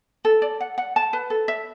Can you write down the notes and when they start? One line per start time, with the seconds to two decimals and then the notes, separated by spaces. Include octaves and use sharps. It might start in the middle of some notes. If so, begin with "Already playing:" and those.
0.25 A4
0.42 D5
0.60 F#5
0.78 F#5
0.96 A5
1.13 B4
1.30 A4
1.48 E5